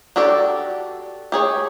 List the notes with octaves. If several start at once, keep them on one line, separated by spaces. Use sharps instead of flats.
D4 F#4 G4 A4 D5
G4 G#4 C#5